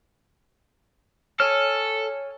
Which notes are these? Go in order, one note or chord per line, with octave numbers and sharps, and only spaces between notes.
A4 C#5 G#5 F6